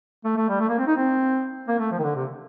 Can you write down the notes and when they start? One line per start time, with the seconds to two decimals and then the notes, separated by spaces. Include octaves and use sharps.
0.24 A3
0.37 A3
0.49 G3
0.60 A3
0.69 A#3
0.78 C4
0.87 D#4
0.96 C4
1.68 A#3
1.79 A3
1.91 F3
1.99 D#3
2.04 D3
2.16 C3